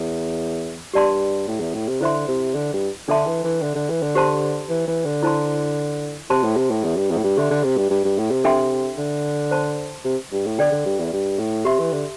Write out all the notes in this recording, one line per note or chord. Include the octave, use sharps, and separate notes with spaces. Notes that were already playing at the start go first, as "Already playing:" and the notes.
Already playing: E2
G2 G4 D5 A5 C6
A2
E2
A2
C3
D3 E4 C5 E5 C6
C3
D3
G2
D3 D4 A4 E5 A5 C6
E3
E3
D3
D3
E3
D3
G4 C5 A5 C6
E3
E3
D3
E4 C5 A5 C6
C3 C5 A5 C6
A2
C3
A2
E2
G2
E2
A2
G2
D3 G4 E5 C6
D3
C3
G2
G2
G2
A2
C3
D4 A4 E5 G5 C6
D3
C5 A5 C6
C3
G2
A2
D3 A4 D5 G5
D3
G2
E2
G2
A2
C3 G4 E5 C6
E3
D3